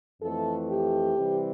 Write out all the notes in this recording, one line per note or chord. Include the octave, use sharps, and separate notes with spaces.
F2 E3 A3 A4
G4
C3 E3 G3 C4